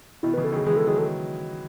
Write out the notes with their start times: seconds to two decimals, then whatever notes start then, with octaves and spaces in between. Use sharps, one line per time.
0.23 B2 D#3 E4
0.34 C#3 E3 B4
0.44 A4
0.52 D#3 F#3 G#4
0.66 E3 G#3 G#4
0.77 A4
0.87 D#3 F#3 G#4
0.98 A4